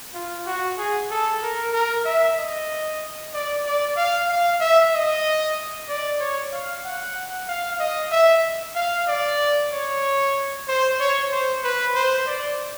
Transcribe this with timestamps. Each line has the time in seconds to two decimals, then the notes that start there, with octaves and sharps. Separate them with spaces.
0.13 F4
0.46 F#4
0.78 G#4
1.10 A4
1.42 A#4
1.73 A#4
2.05 E5
2.38 D#5
3.33 D5
3.66 D5
3.97 F5
4.28 F5
4.60 E5
4.92 D#5
5.89 D5
6.20 C#5
6.52 F5
6.84 F#5
7.48 F5
7.79 D#5
8.12 E5
8.75 F5
9.07 D5
9.72 C#5
10.68 C5
11.00 C#5
11.32 C5
11.63 B4
11.94 C5
12.26 D5